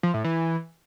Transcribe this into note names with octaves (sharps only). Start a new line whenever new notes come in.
F3
A2
E3